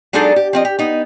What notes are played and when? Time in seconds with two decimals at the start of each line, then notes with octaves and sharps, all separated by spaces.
0.13 F#3 G#3 D4 D#4 G#4 A4
0.36 G4
0.53 F3 C4 D#5
0.65 G4
0.79 B3 D#4